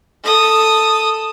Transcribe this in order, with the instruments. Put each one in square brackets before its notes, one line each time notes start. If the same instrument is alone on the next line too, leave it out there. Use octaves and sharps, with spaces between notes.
[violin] A4 D#6